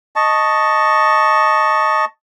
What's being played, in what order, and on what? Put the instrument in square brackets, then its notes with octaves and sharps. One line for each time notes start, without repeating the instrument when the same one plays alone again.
[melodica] D#5 A5 C#6